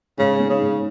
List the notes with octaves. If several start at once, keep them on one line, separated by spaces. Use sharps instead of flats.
G#2 C#3
B3
C#3
G#2